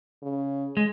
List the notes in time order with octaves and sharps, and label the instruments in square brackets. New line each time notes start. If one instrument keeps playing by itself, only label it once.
[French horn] C#3
[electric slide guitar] G#3